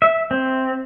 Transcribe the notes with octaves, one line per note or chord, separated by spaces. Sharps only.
E5
C4